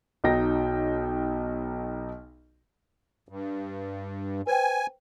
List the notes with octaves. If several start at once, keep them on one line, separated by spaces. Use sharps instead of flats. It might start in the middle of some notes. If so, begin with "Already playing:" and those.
B1 F#3 D#4 G5 A#6
G2
B4 C5 G5 G#5